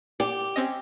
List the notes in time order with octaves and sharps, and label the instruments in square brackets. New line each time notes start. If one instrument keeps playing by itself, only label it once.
[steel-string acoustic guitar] G4
[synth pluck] C4 C#4 D#5